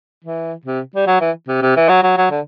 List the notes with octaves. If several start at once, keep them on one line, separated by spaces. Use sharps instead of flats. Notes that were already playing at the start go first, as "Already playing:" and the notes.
E3
C3
G3
F#3
E3
C3
C3
E3
F#3
F#3
F#3
D3